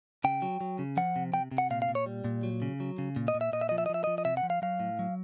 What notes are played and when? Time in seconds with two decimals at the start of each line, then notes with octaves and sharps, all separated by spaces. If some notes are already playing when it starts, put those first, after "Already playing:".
0.24 C#3 G5
0.42 F#3
0.61 F#3
0.79 C#3
0.97 F3 F#5
1.16 C3
1.33 C3 G5
1.52 C3
1.58 F#5
1.70 A#2 F5
1.82 F5
1.88 A#2
1.95 C#5
2.06 G3
2.24 A#2
2.43 F#3
2.62 C#3
2.80 F#3
2.98 C#3
3.16 A#2
3.28 D#5
3.35 A#2
3.41 E5
3.53 A#2 D#5
3.61 E5
3.69 F3 D#5
3.78 E5
3.86 D#5
3.90 F3 E5
4.04 F3 D#5
4.18 D#5
4.25 C3 E5
4.37 F#5
4.43 F3
4.50 F5
4.62 F#3 F5
4.80 A2
4.99 F#3